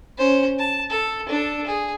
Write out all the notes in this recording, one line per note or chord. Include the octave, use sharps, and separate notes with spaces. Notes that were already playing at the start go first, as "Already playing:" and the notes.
C#4 C5
A5
A4
D4 A4
G#4